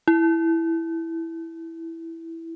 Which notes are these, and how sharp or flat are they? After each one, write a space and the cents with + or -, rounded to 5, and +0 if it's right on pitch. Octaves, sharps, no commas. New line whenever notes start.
E4 +0